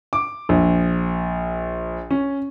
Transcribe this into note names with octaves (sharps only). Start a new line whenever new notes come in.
D6
A#1
C#4